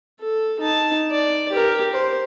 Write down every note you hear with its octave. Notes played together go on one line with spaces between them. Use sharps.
A4
D#4 A5
D5
G4 A#4
C5